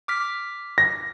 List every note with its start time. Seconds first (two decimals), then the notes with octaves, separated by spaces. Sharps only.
0.08 D6 F6 B6
0.78 A#6